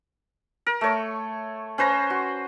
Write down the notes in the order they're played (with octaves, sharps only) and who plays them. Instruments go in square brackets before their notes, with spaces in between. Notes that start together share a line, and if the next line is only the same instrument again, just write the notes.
[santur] A#4
A3 C#5
C#4 B4 C5 A#5
F#4